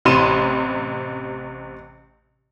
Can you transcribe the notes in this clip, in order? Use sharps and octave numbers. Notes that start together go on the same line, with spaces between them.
A1 C3 B5 C6 D#7 E7